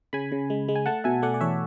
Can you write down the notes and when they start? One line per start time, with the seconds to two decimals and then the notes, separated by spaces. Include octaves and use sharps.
0.13 C#3 G#5 B5
0.32 C#3
0.50 G#3
0.68 G#3
0.76 G#5
0.86 A3 F#5 A5
1.04 B2 E5 G#5
1.22 A3 D5 F#5
1.34 D5
1.41 E2 C#5 E5